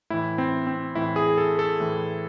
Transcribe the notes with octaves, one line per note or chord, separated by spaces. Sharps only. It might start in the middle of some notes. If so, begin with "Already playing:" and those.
A2 E3 E4
C4
C4
A2 E3 E4
G#4
A4
A4
A2 E3